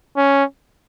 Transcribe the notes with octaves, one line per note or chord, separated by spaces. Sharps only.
C#4